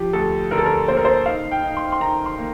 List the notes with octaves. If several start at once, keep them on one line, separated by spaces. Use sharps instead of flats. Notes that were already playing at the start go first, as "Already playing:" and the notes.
Already playing: F3 G4
D2 A4
D3 A#4
A4
A#4
A#3 C5
A#4
C5
D#4 F5
G5
D#4
C6
C6
D#3 A#5
C6
A#3